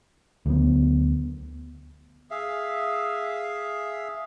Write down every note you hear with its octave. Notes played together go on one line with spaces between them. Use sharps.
D2 F#3 B3
G#4 E5 F5